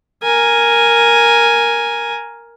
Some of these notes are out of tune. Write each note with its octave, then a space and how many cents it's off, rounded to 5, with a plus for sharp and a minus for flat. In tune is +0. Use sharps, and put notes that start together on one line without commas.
A#4 +0 G#5 +0